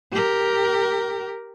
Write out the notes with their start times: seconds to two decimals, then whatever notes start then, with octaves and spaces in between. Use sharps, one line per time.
0.12 G4 A#4